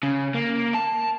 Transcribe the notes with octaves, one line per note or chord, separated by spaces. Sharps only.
C#3
A#3
A5